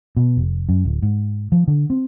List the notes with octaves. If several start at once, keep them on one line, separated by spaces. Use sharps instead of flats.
B2
F1
F#2
D1
G#2
F3
D3
C4